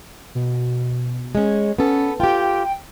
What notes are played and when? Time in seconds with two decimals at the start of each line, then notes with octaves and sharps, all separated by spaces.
0.35 B2
1.35 G#3 C#4
1.78 B3 C#4 A4
2.20 F4 G4 G5